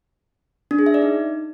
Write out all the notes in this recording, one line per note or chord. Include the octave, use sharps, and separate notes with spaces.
D4
G#4
E5
D5
D#4